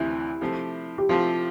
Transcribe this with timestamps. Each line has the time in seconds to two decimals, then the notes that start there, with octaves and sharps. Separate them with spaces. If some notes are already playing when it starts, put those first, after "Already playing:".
Already playing: D2 C3 E3 E4
0.41 C3 F3 A3 C4 G4
0.98 G4
1.09 C3 F3 A3 C4 F4 G4